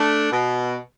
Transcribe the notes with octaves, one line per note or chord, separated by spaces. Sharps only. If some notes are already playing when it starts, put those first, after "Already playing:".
Already playing: A3 D4
B2